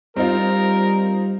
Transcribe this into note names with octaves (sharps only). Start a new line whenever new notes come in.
G3 C4 D#4 F4 A#4